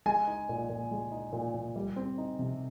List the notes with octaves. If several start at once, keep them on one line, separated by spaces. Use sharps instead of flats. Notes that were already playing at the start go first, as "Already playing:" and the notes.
G#3 G#5
D#4
A#2
A#2
G#3
D#4
A#2
A#2
G3
C4
D#4
C3